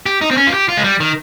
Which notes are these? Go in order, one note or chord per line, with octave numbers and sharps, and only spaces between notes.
G4
D#4
C4
C#4
F4
G4
F4
G#3
G3
D#3